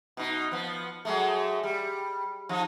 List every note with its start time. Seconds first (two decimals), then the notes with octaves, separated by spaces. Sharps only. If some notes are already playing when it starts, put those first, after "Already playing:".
0.17 B2 D#4
0.52 F3 B3
1.05 F#3 G#3 A3
1.64 G3
2.49 F3 D#4